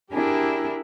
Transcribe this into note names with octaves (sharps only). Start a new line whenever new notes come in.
D4 E4 G4 G#4 A#4